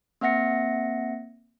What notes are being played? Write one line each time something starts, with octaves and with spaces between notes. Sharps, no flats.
A#3 C4 E5 F#5 A#6 C#7